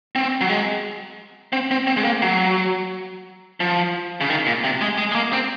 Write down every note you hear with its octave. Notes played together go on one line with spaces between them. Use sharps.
C4
F#3
G#3
C4
C4
C4
G#3
A#3
F#3
F3
C#3
D#3
A#2
C3
G#3
G#3
G#3
A#3
C4